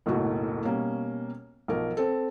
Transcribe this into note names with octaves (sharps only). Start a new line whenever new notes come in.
F#1 B1 A2 F#4
B2 G3 A#3 C#4
B1 F3 A#4
C4 A4